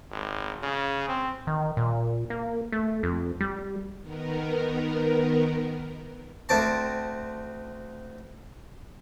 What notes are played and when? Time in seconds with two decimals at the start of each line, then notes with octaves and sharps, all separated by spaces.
0.11 G#1
0.63 C#3
1.08 C4
1.47 D#3
1.77 A#2
2.30 A#3
2.72 A3
3.03 F2
3.41 G3
4.01 D#3 B3 A#4
6.49 D2 C4 A5